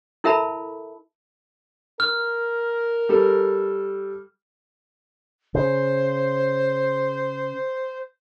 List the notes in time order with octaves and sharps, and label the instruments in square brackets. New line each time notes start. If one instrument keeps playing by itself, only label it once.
[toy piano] E4 A4 A#4 E5 A5 B5
[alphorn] A#4 [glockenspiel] F6
[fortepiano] G3 A4
[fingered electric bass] C#3 [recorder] C5